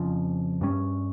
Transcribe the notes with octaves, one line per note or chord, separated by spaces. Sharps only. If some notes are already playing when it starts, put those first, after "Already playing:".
Already playing: F2 C#3 F3
G2 G3 C#4